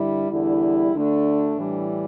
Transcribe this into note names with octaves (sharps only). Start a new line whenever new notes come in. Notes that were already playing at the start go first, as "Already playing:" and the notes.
Already playing: G2 D3 G3 E4
E2 D3 G3 E4
D2 D3 A3 D4
A2 E3 G3